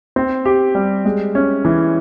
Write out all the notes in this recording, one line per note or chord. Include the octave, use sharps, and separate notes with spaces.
C4
G4
G3
G#3
C#4
E3